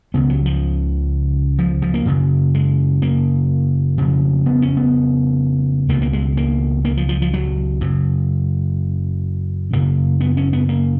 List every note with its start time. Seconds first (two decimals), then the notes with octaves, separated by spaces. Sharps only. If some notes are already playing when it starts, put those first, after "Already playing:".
0.14 C#2 C#3 B3
0.30 F#3
0.46 F3
1.59 F3
1.82 F3
1.94 A#3
2.05 F#2 C#3
2.55 G#3
3.02 A#3
3.98 F2 C#3
4.46 B3
4.62 C#4
4.77 B3
5.89 C#2 B2 A#3
6.02 A#3
6.13 G#3
6.37 A#3
6.85 A#3
6.97 F3
7.09 F3
7.22 F3
7.34 F#3
7.81 F#2 C#3
9.73 F#2 C#3 A#3
10.21 B3
10.37 C#4
10.53 B3
10.69 A#3